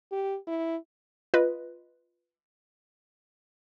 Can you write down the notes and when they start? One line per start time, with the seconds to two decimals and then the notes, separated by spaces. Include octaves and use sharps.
0.12 G4
0.47 E4
1.34 F4 B4 D#5